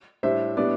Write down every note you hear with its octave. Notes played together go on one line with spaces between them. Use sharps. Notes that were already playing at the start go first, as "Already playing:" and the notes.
A2 G3 D4 C5 E5
A2 G3 B3 D4 D5